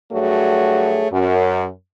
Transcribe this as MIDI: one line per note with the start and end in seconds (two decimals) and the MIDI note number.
0.13 1.07 43
0.13 1.07 54
0.13 1.07 57
0.13 1.07 66
0.13 1.07 68
0.13 1.07 73
1.12 1.67 42